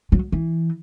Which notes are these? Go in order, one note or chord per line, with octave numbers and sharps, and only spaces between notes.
F#3
E3